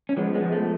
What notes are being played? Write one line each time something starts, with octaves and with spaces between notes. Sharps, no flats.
C#4
F3 G#3 B3
G#3 B3
F3
A3